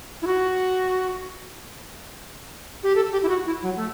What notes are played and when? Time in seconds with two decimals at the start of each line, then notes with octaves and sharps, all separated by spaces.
0.22 E4
0.27 F#4
2.83 G4
2.95 A4
3.12 G4
3.23 E4
3.29 F#4
3.46 E4
3.63 F#3
3.76 A3